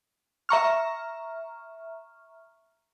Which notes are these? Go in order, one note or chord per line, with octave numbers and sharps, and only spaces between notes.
E5 A#5 C#6 F6